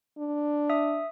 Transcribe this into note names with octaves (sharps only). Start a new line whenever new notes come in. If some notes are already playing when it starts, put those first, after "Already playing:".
D4
E5 D#6